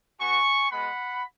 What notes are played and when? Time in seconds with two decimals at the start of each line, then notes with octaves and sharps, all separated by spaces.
0.20 B3 F#4 G#5 C#6
0.70 G#3 B3 F#4 F#5 B5